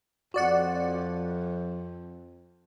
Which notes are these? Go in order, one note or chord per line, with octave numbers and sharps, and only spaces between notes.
F2 F#4 D5 F#5